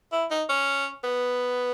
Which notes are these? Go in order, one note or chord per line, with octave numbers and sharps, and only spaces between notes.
E4
D#4
C#4
B3